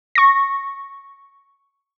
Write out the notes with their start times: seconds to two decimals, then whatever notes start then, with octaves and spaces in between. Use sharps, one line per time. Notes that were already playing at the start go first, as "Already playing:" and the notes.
0.15 C#6 A#6